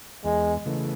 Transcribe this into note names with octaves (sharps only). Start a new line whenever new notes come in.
E2 G#3
C#3 E3 A3